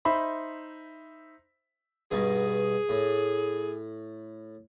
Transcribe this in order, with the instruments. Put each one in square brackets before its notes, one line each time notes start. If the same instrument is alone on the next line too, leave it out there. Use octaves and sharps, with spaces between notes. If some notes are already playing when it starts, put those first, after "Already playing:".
[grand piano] D#4 C5 E5 B5 C6
[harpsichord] G2 B2 D#4 [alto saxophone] G#4
[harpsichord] A2